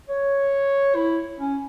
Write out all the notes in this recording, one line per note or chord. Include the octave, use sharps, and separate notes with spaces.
C#5
E4
C#4